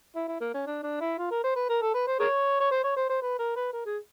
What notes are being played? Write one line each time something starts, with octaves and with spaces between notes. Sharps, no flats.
E4
E4
A#3
C#4
D4
D4
E4
F4
A#4
C5
B4
A#4
A4
B4
C5
G#4 A#4 C#5
C#5
C5
C#5
C5
C5
B4
A#4
B4
A#4
G#4